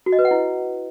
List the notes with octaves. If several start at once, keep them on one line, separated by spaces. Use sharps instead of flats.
F#4
D#5
B4
F#5
E4